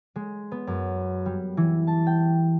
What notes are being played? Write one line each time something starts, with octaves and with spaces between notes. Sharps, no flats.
G#3
B3
F#2
G3
E3
A5
G5